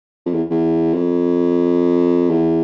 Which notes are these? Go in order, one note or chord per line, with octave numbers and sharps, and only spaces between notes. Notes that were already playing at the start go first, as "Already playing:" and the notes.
F2
E2
E2
F2
E2